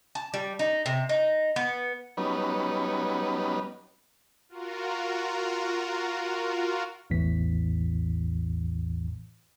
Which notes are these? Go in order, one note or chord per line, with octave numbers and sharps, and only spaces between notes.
A5
G3
D#4
C3
D#4
B3
F#3 G3 B3 C#4 D#4 B4
F4 F#4 A#4
A1 E2 A2 E3 B6